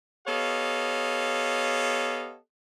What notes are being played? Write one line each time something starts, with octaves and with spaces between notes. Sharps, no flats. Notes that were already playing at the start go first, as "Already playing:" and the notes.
B3 G4 A4 C#5 D#5 F5